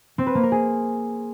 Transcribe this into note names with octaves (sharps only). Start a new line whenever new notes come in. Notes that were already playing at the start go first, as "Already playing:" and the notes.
C4
B4
A#3
A#4
G#4